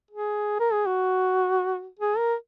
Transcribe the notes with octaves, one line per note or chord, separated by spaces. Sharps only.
G#4
A#4
G#4
F#4
G#4
A#4